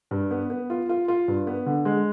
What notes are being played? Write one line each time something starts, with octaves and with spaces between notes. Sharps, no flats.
G2
B3
B3
F4
F4
F4
G2
B3
D3
G#3